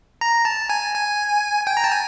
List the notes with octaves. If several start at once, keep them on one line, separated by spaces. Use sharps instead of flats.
A#5
A5
G#5
G#5
G5
A#5
A5
G#5